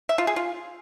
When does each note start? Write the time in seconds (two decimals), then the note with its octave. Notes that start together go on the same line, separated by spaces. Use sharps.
0.09 E5
0.18 F4
0.27 G#4
0.36 F4